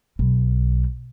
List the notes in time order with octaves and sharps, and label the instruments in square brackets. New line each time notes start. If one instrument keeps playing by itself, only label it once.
[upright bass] B1